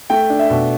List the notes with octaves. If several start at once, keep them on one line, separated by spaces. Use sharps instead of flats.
A3 G5
D4
E5
B2